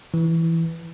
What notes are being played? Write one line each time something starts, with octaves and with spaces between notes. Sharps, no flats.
E3